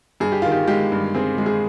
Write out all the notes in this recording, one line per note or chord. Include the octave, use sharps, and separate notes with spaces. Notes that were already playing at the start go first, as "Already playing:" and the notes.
G2 G#4
G4
D#3 F4
G4
G#3 G4
G2
C4 G#4
G#3
G#4